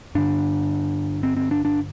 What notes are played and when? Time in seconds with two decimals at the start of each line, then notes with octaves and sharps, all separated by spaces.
0.15 G2 D3 D4
1.23 C4
1.37 C4
1.51 D4
1.65 D4